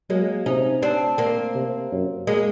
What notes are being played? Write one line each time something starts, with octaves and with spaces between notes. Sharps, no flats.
F#3 G#3 A#3
C3 C#4 D#4
C4 D4
A#3 C4
C3
F#2
G#3 A#3